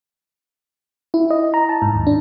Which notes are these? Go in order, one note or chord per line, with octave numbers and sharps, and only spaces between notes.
E4
D#5
A#5
A5
G#2
D#2
D4